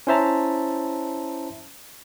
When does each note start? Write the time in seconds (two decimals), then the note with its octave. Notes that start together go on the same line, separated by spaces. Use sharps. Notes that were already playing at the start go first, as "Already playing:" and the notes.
0.07 C#4 E4 C5 E5 A5 A#5